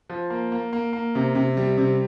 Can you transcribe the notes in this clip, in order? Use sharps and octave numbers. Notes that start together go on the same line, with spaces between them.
F3
A#3
A#3
A#3
A#3
C3
C3
G3
C3